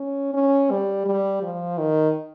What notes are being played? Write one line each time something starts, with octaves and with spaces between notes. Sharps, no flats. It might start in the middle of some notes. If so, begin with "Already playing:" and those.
Already playing: C#4
C#4
G3
G3
F3
D#3